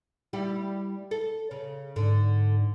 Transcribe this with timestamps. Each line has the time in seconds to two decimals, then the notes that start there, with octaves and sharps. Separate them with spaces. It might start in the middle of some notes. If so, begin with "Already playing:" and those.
0.33 G3 E4 G4
1.11 A4
1.51 C#3
1.96 G#2 D3